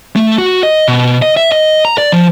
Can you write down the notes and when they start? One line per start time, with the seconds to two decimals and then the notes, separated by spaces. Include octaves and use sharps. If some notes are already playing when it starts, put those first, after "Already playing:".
0.16 A3
0.38 F#4
0.63 D#5
0.88 B2
1.22 D#5
1.37 E5
1.52 D#5
1.85 A#5
1.98 D5
2.12 F3